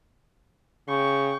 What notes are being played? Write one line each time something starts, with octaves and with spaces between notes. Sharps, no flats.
C#3 G5 C#6